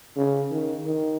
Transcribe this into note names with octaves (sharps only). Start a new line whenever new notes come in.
C#3
D#3
D#3